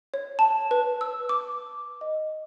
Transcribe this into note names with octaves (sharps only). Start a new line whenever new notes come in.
C#5
A5
B4
E6
D6
D#5